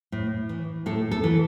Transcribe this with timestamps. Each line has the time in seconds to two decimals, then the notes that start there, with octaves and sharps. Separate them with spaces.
0.12 A2
0.49 E3
0.86 A2 A4
1.11 A4
1.24 E3